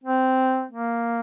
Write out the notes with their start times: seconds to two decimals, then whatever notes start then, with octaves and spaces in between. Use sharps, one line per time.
0.04 C4
0.71 A#3